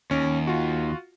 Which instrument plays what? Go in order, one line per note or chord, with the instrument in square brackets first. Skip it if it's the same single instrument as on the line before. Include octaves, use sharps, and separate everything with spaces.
[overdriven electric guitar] D#2 [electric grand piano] C#4
[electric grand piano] F4 F#4